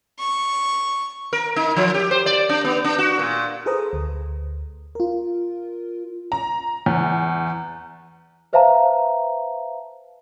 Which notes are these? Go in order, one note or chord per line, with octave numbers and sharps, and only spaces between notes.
C#6
A#4
D#4
F3
G4
C5
D5
D4
B3
D4
F#4
A#2
G#4 A4 B4 C5 A#5 D#6
D2
F4 A#4
A#5
E2
B4 C5 E5 F5 A5 A#5